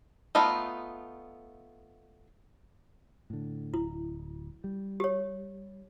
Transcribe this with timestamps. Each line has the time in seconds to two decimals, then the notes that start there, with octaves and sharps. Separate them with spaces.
0.35 A3 B3 D#4 F4
3.30 A2 D3
3.74 D1 E4
4.64 G3
5.00 G4 C#5